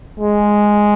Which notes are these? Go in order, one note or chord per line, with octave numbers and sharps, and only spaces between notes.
G#3